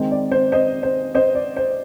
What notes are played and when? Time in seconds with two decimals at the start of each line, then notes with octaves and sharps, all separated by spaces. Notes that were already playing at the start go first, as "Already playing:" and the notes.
Already playing: D#3 G#3 C4
0.11 D5
0.32 C5
0.52 C5 D#5
0.83 C5
1.15 C5 D#5
1.35 D5
1.56 C5